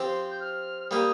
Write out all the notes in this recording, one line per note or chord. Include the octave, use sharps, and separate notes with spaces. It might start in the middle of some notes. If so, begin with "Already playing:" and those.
Already playing: F3 C4 G4 C6
G6
F6
G3 A#3 G4 D#6